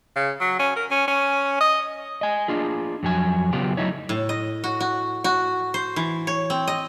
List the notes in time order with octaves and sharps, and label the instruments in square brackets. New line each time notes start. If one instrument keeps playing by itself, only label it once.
[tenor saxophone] C#3
F#3
C#4
A#4
C#4
C#4
D#5
[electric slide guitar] D#5 G#5
D4 F4 G#4
F2 F#3 G#5
C#3 F#3 B3 F4 G4
F#3 A3 D#4 E4 C#5
[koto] A2
D#5
F#4
F#4
F#4
C5
E3
C#5
C4
D#5